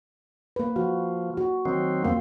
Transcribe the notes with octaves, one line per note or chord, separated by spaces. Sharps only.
A#3 B4
F3 F#4
F#4
D#3 F#3 C4
F2 A#3 C4